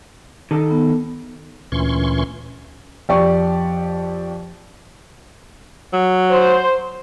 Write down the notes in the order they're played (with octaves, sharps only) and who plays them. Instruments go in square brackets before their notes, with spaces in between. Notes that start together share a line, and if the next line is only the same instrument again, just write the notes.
[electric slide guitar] D#3 A4
[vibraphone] B3
[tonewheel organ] D2 A#2 E3 C#4 C6 C#6
[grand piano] F2 G4 D5 C#6
[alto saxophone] F#3
[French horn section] C5